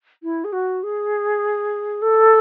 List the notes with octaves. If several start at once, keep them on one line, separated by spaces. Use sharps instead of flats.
E4
G#4
F#4
G#4
A4